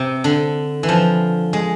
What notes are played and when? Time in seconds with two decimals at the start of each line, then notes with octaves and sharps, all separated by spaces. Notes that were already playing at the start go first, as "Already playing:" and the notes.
Already playing: C3
0.24 D3
0.83 E3
0.89 F3
1.53 G#3